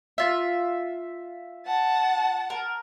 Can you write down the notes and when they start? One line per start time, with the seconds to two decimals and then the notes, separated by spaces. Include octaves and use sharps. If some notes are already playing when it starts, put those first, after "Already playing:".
0.18 F4 E5
1.66 F#5 A5
2.50 A#4